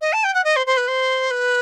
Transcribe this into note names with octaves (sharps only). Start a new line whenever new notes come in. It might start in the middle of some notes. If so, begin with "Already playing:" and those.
D#5
A5
G5
F#5
D#5
C5
C5
B4
C5
B4